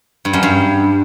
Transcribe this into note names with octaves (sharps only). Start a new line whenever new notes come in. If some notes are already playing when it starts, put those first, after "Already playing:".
G2
F#2
G2